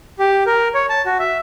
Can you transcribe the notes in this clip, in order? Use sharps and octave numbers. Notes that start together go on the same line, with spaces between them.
G4
A#4
C#5
A5
F#4
E5